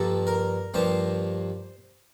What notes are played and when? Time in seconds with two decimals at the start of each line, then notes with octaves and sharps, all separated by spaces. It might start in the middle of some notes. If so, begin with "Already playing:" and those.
Already playing: G2 F3 A#3 A4
0.27 A#4
0.74 G2 F3 A#3 C5